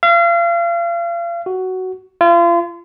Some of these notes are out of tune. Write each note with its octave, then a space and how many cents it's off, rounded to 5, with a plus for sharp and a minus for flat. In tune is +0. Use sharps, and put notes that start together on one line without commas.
F5 -35
F#4 +10
F4 -35